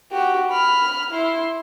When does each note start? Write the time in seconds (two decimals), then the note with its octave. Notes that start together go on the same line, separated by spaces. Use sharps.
0.12 F#4 G4
0.50 B5 F6
1.11 E4 C6